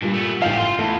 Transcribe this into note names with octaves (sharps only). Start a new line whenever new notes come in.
G2 A#2 G3
A3 B3
A1 F3 G#3 G4 F5
F4 C6
E2 A3 E4 F4